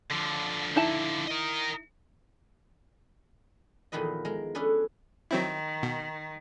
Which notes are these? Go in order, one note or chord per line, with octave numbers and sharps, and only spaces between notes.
D3 F3
D#4 E4 A5
A#4 D#5
E2 A#2 D#3 F3 B4 D#5
G#3 A#4
C#4 D4 G#4 A4 B4
D#3 F#3 C4 E4
B2